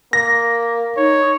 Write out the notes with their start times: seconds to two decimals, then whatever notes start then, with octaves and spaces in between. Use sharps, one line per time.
0.13 A#3 A#6
0.97 D#4 C#5